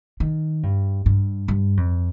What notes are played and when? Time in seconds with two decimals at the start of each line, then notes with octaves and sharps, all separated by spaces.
0.20 D#3
0.63 G2
1.06 G2
1.48 G2
1.77 F2